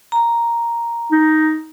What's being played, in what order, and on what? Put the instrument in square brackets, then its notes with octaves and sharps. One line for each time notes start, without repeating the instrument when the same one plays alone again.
[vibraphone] A#5
[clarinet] D#4